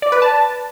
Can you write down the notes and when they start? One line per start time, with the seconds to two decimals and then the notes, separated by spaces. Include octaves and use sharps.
0.02 D5
0.12 B4
0.22 A5